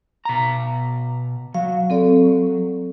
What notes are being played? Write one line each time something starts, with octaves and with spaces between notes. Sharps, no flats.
B2 A#5
F#3 F5
C4 A4 D5